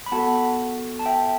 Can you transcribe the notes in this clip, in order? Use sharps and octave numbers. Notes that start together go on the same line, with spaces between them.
B5
B3 F#4 A4 F#5 A5
A5
E5 G5